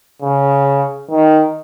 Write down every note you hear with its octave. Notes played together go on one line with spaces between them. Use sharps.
C#3
D#3